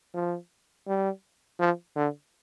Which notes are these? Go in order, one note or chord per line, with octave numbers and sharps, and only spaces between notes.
F3
G3
F3
D3